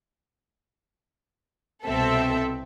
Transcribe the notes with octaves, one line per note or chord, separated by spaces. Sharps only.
C2 B2 C4 A4 E5